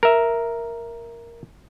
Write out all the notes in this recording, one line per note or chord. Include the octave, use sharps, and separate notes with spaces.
A#4 E5